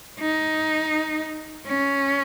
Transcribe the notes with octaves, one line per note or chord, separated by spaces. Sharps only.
D#4
C#4